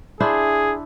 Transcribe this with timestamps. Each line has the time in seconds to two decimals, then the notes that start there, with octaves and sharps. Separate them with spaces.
0.20 D4 E4 G#4 C5